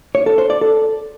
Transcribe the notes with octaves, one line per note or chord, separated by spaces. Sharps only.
C#5
A4
C5
D5
A4